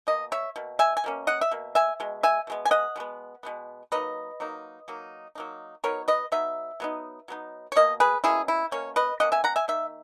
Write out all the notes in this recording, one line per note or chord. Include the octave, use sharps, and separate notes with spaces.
B2 A#3 D#5
C#5 E5
B2 A#3
E5 G#5
G#5
B2 A#3 C#4
D#5 F#5
E5
B2 A#3
E5 G#5
B2 G#3
E5 G#5
B2 G#3 B3
G#5
D#5 F#5
B2 G#3 B3
B2 G#3 B3
F#3 A#3 D#4 B4 D#5
F#3 A#3 D#4
F#3 A#3 D#4
F#3 A#3 D#4
F#3 B3 D#4 A#4 C#5
B4 D#5
F#3 B3 D#4 E5
F#3 B3 D#4
F#3 B3 D#4
C#5
B2 A#3 D#5
G#4 B4
B2 A#3 C#4 E4 G#4
E4
B2 A#3 C#4 C#5
B4 D#5
B2 A#3 C#4 D#5 F#5
E5 G#5
F#5 A#5
E5 G#5
D#3 A#3 E5